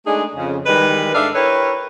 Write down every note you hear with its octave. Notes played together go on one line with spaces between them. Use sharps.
G#3 A3 D4 D#4 G#4
F2 C#3
D#3 E3 G3 G#3 B4
G#2 D4 A4 D5 E5 F5
E4 G4 A#4 B4 C#5